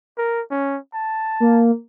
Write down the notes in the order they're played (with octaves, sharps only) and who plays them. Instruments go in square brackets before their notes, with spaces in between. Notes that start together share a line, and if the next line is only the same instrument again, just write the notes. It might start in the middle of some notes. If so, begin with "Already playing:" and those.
[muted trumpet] A#4
C#4
A5
[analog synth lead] A#3